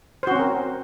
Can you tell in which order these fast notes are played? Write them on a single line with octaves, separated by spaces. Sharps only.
C5 F#4 C#4 C4 A#4